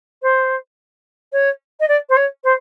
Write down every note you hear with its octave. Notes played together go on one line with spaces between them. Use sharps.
C5
C#5
D#5
D5
C5
C#5
C5